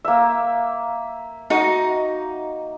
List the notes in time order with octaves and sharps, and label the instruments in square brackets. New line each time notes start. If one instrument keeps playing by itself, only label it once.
[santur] A#3 E5
[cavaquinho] D#4 F#4 D#5